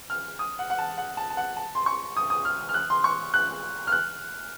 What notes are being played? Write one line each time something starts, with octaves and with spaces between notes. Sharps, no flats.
F6
D#6
F#5
F#5
A5
F#5
A5
A5
F#5
A5
C6
C#6
D#6
D#6
F6
F6
F#6
C6
C#6
F#6
F6
F#6